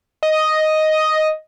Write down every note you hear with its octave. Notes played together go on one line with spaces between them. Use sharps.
D#5